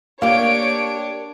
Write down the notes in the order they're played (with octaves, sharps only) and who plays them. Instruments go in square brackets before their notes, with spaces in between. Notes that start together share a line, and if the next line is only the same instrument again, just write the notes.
[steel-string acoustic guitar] A#3 G4 [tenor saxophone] D4 [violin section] C#5 D7 [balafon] F5